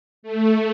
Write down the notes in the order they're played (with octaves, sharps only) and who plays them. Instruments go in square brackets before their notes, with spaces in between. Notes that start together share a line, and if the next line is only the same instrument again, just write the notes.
[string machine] A3